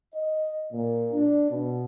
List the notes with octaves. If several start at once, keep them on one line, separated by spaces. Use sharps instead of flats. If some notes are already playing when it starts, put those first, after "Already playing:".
D#5
A#2
D4
B2